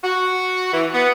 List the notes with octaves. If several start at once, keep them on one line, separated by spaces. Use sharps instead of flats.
F#4
E3
B3